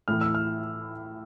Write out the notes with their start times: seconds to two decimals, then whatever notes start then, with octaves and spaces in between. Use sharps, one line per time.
0.08 A2 E3 F6
0.21 E6
0.35 F6